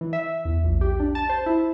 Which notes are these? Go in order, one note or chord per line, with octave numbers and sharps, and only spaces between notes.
E3
E5
E2
A#1
G4
D4
A5
C5
E4